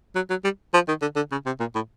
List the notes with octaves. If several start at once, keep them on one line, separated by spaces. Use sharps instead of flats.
F#3
F#3
G3
F3
D#3
D3
D3
C#3
C3
A#2
A2